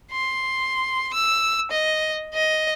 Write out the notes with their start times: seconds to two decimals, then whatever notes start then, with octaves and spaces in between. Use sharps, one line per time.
0.11 C6
1.14 E6
1.72 D#5
2.34 D#5